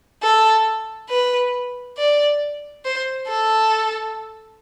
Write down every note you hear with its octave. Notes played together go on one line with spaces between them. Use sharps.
A4
B4
D5
C5
A4